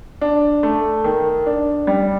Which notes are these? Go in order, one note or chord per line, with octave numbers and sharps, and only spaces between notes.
D4
A3
D#3
D4
G3